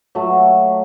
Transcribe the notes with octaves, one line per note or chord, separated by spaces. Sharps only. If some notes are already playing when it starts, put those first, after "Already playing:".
F#3 A3